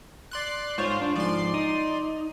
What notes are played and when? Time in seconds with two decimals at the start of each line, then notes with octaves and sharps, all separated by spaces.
0.31 D5 C6 F#6
0.78 G#2 F4 C5 C#5
1.01 D4
1.15 G#2 F3 D5 C6
1.54 D#4